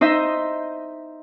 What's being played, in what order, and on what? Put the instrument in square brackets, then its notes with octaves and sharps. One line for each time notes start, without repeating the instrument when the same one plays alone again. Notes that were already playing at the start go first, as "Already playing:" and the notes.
[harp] D#4 C5 D#5 E5